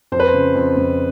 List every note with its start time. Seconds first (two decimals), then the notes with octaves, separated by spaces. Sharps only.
0.12 F2 C5
0.20 B4
0.27 C5
0.34 C#3
0.55 F2
0.77 F2